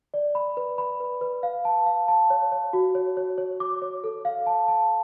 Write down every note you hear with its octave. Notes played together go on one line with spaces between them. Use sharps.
D5
B5
B4
B5
B4
B4
F5
A5
F5
A5
C#5
C#5
F#4
C#5
C#5
C#5
D6
C#5
A4
F5
A5
A5